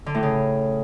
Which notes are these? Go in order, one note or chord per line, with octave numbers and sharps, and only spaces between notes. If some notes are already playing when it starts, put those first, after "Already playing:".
D3
A2
C#3